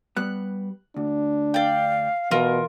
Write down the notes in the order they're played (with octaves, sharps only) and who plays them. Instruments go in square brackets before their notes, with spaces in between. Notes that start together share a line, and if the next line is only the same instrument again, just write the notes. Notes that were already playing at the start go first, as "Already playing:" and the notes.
[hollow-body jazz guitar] G3 B3 [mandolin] F#6
[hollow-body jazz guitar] D2 [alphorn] D4
[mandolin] D5 G5 [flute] F5
[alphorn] B2 [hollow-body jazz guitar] E3 E5 [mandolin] F4 A#4